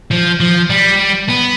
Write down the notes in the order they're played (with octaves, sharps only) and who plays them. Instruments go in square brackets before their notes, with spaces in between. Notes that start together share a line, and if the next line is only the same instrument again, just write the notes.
[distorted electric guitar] F3
F3
G3
B3